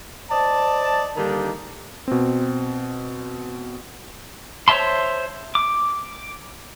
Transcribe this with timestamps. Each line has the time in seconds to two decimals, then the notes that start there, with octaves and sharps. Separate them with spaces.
0.31 C5 D5 D#5 A5
1.16 D3 D#3 G3 A#3 D4 D#4
2.08 B2 C4
4.68 C5 C#5 E5 A5 C6
5.55 D6